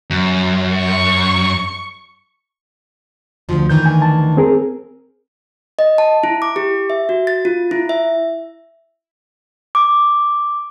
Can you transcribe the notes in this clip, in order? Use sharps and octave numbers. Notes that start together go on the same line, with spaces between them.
F#2
C#6
D2 F3
D2 D#3 E3 G6
G#5
A5
C4 G#4 A#4
D#5
A5
E4
D6
G4
E5
F#4
A6
F4
E4
E5
D6